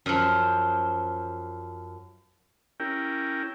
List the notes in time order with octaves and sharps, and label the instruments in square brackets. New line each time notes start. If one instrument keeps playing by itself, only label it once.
[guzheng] F#2 F3
[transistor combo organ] C#4 E4 G4 A#4 G5